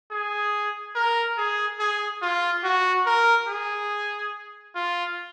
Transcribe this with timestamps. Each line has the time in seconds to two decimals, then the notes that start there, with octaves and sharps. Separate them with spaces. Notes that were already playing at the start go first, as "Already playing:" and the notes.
0.11 G#4
0.95 A#4
1.37 G#4
1.79 G#4
2.22 F4
2.64 F#4
3.06 A#4
3.48 G#4
4.75 F4